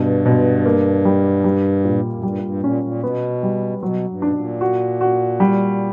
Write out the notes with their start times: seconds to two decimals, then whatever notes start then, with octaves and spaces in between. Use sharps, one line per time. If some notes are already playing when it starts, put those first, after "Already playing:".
Already playing: G2 B2
0.26 B2
0.65 A#3
1.05 G3
1.44 G3
1.84 A#2
2.13 F#2
2.23 G2 G3
2.43 G2
2.63 A#2 C#4
2.84 A#2
3.03 B2 B3
3.43 G3
3.82 B2 F#3
4.08 G2
4.22 B2 D4
4.35 A#2
4.61 F#4
5.01 F#4
5.40 G3